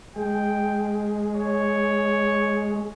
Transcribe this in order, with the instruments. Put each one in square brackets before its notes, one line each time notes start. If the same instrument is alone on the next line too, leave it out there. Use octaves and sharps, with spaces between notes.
[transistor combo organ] G#3 [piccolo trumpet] G5
[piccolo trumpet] C#5